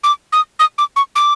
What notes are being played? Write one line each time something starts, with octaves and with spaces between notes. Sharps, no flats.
D6
D#6
D#6
D6
C#6
D6